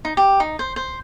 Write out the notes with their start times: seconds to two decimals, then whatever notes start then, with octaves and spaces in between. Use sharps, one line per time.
0.05 D#4
0.17 G4
0.40 D#4
0.59 C5
0.76 C5